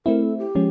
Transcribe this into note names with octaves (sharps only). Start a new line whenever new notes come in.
A3 C4 E4 A#4
A4
G4
F3 G#3 C#4